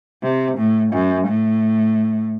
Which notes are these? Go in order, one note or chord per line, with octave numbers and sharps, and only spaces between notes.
C3
A2
F#2
A2